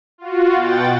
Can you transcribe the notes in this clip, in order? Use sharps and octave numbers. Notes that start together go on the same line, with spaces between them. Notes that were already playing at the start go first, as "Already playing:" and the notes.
F4 F#4
B2 F#5 G5 A6